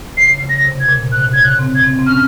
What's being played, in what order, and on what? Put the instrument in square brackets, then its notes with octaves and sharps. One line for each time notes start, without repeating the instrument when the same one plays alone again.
[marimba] C#3 [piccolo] C7
[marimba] C#3
[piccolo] A#6
[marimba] C3
[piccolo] G#6
[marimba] A#2
[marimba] C3 [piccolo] F#6
[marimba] C#3 [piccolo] G#6
[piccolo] F#6
[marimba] C4
[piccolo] G#6
[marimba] C4
C4
[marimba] C#4 [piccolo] F6